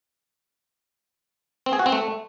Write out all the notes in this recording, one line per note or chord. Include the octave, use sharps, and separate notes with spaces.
C4
G#4
F#4
C4
A3